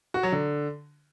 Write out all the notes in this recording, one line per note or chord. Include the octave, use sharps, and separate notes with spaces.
F#4
F#3
D3